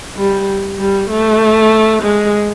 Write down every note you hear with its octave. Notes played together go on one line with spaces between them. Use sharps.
G3
G3
A3
G#3